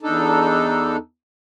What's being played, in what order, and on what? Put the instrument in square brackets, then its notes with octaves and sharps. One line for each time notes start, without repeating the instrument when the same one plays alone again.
[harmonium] E2 D4 D#4 A4